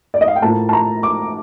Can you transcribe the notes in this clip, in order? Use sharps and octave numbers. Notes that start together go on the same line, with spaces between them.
D5
D#5
F5
G5
A2 F3 A#3 A5
A5
A#5
D6